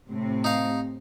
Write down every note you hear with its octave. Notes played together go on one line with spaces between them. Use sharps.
A2 C3 C4
D#4 F5